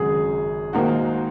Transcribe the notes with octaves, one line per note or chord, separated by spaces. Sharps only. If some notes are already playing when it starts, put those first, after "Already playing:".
Already playing: G#1 F#2 C#3 G#3 G#4
G#2 D#3 A#3 D#4 F#4